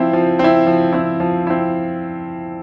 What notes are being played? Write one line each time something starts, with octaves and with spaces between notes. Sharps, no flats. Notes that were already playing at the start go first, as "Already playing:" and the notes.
Already playing: F3 C4 E4
F3
C4 E4
F3
C4 E4
F3
C4 E4